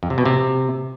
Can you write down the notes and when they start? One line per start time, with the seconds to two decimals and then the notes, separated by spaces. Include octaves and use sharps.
0.03 F2
0.10 C3
0.18 B2
0.26 C3